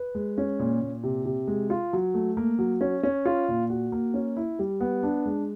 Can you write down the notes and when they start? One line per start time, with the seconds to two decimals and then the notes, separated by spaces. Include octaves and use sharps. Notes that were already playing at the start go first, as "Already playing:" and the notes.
Already playing: B4
0.15 G#3
0.38 C#4
0.59 A#2
0.81 A#2
1.03 C3
1.25 C3
1.48 G#3
1.70 F4
1.93 F#3
2.14 A3
2.37 A#3
2.59 F#3
2.81 C#4
3.03 C#4
3.25 F4
3.48 A#2
3.70 F#4
3.92 A#3
4.14 C#4
4.37 E4
4.59 G3
4.81 B3
5.03 D4
5.26 G#3